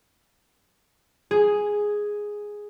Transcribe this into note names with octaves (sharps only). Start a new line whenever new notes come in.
G#4